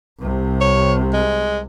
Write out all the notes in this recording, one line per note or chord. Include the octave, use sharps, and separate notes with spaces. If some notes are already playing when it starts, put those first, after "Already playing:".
C2 C3
C#5
G#3